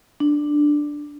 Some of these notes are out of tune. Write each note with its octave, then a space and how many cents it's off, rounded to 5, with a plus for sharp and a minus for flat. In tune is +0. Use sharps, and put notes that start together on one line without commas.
D4 +5